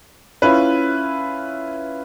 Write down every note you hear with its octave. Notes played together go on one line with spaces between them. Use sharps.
C#4 E4 F4 B4